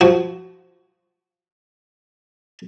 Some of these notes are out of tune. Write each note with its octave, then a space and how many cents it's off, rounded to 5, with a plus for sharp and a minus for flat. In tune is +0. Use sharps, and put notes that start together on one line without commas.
F3 +0 F#4 +15